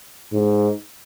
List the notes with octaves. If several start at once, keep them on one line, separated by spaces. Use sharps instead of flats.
G#2